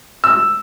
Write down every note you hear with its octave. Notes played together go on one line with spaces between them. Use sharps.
E6